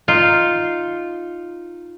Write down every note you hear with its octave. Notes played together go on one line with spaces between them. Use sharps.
D#4 F4